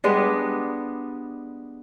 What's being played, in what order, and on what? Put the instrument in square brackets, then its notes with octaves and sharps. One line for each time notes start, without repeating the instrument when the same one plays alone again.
[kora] G3 G#3 B3 D4